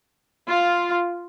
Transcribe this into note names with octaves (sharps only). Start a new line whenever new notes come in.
F4